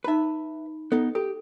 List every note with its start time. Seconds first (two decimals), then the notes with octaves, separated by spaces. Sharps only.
0.04 D#4 B4 E5 B5
0.92 B3 D#4 A4
1.15 G4 A4